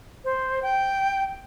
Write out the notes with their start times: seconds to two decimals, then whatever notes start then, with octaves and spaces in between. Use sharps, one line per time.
0.25 C5
0.63 G5